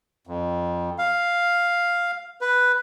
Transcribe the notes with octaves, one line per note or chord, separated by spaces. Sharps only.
F2
F5
B4